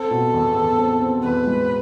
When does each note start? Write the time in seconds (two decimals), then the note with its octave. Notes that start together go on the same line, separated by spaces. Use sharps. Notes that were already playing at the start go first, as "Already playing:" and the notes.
Already playing: C4 A4
0.11 B2
0.34 E2
0.56 E2
0.78 C4
1.01 C4
1.24 E2 B4
1.46 G#3